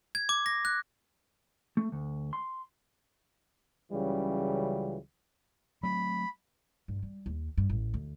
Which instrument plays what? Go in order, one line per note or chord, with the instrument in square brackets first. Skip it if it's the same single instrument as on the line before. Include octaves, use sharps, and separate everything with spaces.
[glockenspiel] G#6
D6
A#6
F#6
[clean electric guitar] A3
D2
C6
[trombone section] C#2 C#3 E3 F#3 G3
[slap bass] F#3 A3 C4 [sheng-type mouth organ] B5
[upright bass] G2
G3
D#2
G2
A1
D2